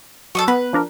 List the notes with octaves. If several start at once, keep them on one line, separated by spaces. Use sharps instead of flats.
F#3 A4 D#5 C#6
B3 B4
F3 D4 A#4